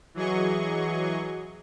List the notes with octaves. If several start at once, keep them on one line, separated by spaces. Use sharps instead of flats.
E3 F#3 G#4 D#5 C#6